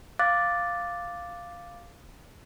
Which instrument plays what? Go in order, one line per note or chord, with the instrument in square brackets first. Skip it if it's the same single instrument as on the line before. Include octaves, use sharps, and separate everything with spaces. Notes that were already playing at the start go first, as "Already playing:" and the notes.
[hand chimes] F5 D6 F#6 A6